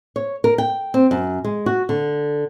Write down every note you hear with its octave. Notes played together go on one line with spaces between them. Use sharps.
C#5
A#4
G5
C4
F#2
G#3
F#4
D3